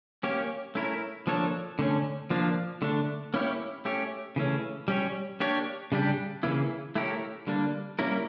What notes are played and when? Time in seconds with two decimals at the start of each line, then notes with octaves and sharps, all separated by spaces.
0.23 A#3 C#4 G4 C#5
0.75 A3 C#4 E4 A#4 C#5
1.27 F3 A#3 D4 A4 C#5
1.79 D3 A3 C#4
2.30 F3 A#3 D4
2.82 D3 A3 D4
3.34 A#3 C#4 E4 G4 C#5
3.85 A3 C#4 G4 C#5
4.36 C#3 E3 A3 C#4
4.88 G3 C#4 G4 C#5
5.40 A#3 D4 G4 C#5
5.92 C#3 G3 D4 G4
6.43 C#3 E3 A#3 E4
6.95 A3 E4 G4 A#4 C#5
7.47 D3 G3 A#3 D4
7.99 G3 A#3 C#4 E4 A#4